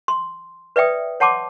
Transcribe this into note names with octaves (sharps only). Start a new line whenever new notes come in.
C6
B4 D5 E5 G5 D#6
C#5 F#5 A5 C6 D6